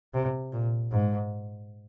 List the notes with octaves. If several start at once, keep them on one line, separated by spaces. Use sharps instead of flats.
C3
A#2
G#2